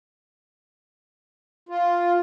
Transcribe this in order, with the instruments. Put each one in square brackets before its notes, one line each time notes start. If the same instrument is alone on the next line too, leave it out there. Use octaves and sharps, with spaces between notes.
[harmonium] F4